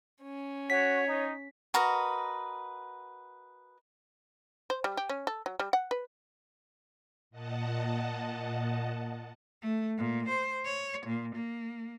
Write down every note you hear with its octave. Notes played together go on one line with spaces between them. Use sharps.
C#4
F#4 C#5 B6
D#4
F#4 A#4 B4 D#5
C5
G3
G4
C#4
A4
F#3
G3
F#5
B4
A#2 D#5 F#5 A5
A3
A#2
C5
C#5
A#2
A#3